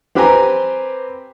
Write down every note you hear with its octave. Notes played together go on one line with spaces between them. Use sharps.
C4 G4 B4 G5 G#5 A#5